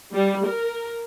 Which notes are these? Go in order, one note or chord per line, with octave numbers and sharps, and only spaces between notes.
G3
A#4